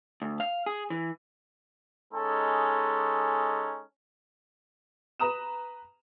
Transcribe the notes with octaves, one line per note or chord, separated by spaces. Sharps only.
D2
F5
G#4
E3
G#3 C#4 D#4 A4
B4 A#5 D#6 E7